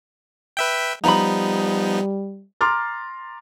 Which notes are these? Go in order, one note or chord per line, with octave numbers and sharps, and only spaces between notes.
B4 E5 G5
F3 G3 B3 D#4 A#5 B5
A#5 C6 D6 F6 A6